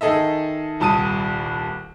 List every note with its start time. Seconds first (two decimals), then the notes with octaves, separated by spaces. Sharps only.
0.01 D#3 G#4 A4 D#5 E5
0.80 D#1 C2 A5 D#6 D#7